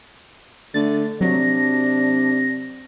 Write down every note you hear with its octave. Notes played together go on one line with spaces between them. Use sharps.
D3 A3 A6
C3 F#3 D4 A#6